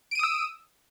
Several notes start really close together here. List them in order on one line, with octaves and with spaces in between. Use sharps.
D7 D#7 D#6 E6